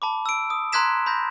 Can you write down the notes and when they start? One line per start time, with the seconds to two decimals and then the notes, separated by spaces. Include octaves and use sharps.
0.02 A5 B5 D6
0.26 E6 D7
0.50 D#6
0.73 A#5 C6 F#6 G#6 B6 E7
1.06 B5 G6 A#6